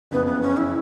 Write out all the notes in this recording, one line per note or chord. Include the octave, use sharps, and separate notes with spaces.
F#1 F2 C#3 E3 B3
B3
C#4
E4